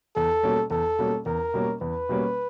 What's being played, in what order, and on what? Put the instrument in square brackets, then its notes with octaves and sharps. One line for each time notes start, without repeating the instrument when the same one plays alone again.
[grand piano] E2 [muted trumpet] A4
[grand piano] B2 G3 A#3 C#4
[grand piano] E2 [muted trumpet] A4
[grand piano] B2 G3 A#3 C#4
[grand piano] E2 [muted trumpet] A#4
[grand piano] B2 G3 A#3 C#4
[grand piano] E2 [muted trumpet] B4
[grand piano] B2 G3 A#3 C#4